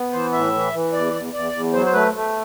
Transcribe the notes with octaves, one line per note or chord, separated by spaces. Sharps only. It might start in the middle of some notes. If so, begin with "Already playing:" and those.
Already playing: B3
E3 C5
A2 E5
E3
E3
E2 D5
E2
E2 D5
E2
F#3 C5
C5
A3 B4
A3